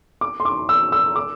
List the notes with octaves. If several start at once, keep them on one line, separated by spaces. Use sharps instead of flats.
D6
C6
D6
E6
E6
D6